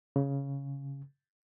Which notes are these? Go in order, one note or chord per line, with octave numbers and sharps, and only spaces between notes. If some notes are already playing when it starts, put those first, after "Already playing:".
C#3